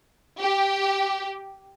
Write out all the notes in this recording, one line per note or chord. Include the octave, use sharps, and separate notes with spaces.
G4